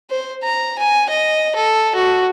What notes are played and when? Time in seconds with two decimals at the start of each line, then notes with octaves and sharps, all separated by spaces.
0.10 C5
0.43 A#5
0.78 G#5
1.09 D#5
1.55 A4
1.95 F#4